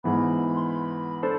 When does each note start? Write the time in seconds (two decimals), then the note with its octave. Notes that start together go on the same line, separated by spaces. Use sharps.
0.04 G#2 E3 B3 B5
0.56 C6
0.63 B5
1.22 D4 A4 C5 A5